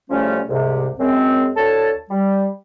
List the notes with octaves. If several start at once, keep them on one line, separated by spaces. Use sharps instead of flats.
A2 C#3 F3 G3 A3 C#4
C2 G#2 C3
F#2 G#3 C4
D2 A4 C#5 A5
G3